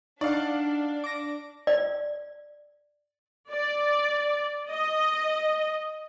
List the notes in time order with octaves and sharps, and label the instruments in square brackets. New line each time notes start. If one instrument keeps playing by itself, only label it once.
[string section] D4 [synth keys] D#4 F#5 [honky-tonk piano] D5 F5
[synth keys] D6 A#6
[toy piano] D5
[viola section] D5
D#5